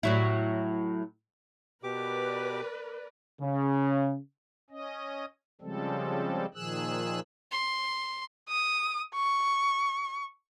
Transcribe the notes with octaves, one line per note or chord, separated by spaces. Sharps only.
A2 F#3 E4
B2 G4 A#4 B4 D5 D6
C#3
C#4 D#5
C#3 F3 G3 G#3 C4 A4
A#2 D#3 F3 G#4 E6 F#6
C6
D#6
C#6